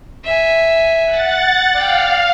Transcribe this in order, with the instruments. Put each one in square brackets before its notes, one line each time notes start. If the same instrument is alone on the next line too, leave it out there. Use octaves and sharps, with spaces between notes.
[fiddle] E5 G#5
[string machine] F#5 A6
[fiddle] D5 G5 [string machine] F5